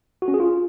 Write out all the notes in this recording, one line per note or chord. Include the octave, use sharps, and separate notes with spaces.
F#4
C#4
G#4
F4